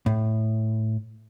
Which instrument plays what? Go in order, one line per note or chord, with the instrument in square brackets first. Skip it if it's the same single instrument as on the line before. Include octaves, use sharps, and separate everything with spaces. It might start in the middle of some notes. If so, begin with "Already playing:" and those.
[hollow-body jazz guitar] A2